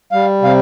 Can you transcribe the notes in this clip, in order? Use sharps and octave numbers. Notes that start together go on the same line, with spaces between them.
G3 F5
C3 F5